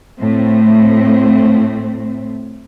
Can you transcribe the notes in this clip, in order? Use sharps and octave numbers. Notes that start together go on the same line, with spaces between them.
A2 A3 C4